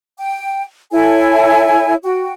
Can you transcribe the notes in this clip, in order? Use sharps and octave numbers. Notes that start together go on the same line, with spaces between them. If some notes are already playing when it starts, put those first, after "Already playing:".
G5
E4 A4 C#5 G#5
F#4 G5